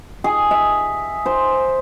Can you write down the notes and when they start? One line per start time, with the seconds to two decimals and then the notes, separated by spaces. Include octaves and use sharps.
0.24 G#4
0.51 E5
1.26 C5